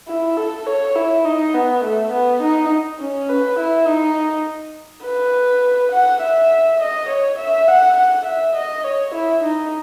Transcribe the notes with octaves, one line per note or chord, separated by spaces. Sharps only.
E4
A4
C#5
E4
D#4
B3
A3
B3
D#4
C#4
B4
E4
D#4
B4
F#5
E5
D#5
C#5
E5
F#5
F#5
E5
D#5
C#5
E4
D#4